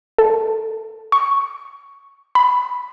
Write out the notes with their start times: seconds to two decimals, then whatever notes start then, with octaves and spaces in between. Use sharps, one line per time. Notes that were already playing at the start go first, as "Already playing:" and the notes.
0.18 A4
1.12 C#6
2.35 B5